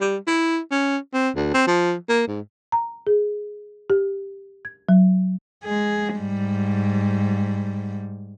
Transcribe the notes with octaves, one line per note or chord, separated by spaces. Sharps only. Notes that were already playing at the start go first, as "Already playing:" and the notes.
G3
E4
C#4
C4
D2
C4
F3
A#3
G#2
A#5
G#4
G4
G#6
F#3
G#3 G#4
G#2 G3